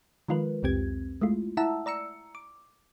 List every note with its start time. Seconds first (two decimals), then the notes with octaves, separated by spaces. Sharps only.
0.28 D#3 F3 G#3 F4 A#4 B4
0.63 C2 F2 C4 G4 G#6
1.21 G#3 A3 E4 F4
1.57 E4 E5 F#5 A5 A#5 E6
1.86 D5 A#5 E6 C#7
2.35 D6